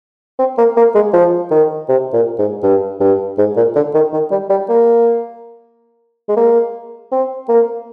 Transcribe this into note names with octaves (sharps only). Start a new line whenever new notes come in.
C4
A#3
A#3
G#3
F3
D#3
C3
A#2
G#2
G2
G2
G#2
A#2
D3
D#3
D#3
G3
G3
A#3
G#3
A#3
C4
A#3